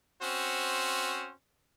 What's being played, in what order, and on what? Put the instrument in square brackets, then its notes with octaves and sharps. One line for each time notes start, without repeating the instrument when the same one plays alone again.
[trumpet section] C4 C#4 F#4 C5